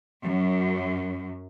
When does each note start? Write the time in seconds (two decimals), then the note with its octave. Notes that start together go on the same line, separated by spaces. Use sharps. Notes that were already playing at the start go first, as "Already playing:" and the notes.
0.23 F#2